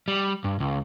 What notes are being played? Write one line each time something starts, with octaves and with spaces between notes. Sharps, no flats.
G3
G2
C#2